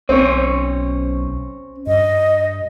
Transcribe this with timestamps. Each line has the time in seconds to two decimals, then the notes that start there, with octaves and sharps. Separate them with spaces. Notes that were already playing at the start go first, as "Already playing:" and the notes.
0.09 B1 C4 C#4 C5 C#5
1.87 G2 D#5